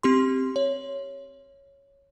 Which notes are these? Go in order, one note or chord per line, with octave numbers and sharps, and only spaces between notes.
C4 G4 C6
C#5